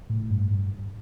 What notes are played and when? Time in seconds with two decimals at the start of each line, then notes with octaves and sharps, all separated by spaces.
0.10 A2
0.30 G2
0.51 G2